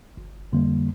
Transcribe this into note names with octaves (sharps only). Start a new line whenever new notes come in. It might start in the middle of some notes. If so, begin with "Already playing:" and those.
G1
F2 D3 G3 A#3